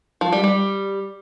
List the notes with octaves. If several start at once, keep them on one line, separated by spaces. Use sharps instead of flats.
F3
G3
G3